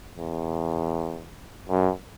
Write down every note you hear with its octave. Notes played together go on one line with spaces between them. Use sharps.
E2
F#2